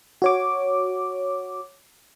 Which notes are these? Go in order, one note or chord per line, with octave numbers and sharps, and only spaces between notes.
F#4 C#5 D6